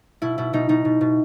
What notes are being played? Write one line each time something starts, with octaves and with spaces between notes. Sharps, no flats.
B2 E4
B2 E4
B2 D#4
B2 D#4
B2
B2